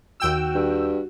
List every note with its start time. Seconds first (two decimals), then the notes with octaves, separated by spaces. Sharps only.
0.20 D#2 F#4 G5 E6
0.55 G2